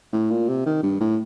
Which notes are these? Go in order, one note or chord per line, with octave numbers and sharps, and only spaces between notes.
A2
A#2
C3
D#3
G2
A2